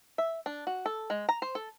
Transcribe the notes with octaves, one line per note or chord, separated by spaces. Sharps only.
E5
D4
F#4
A4
G#3
A#5
C5
A4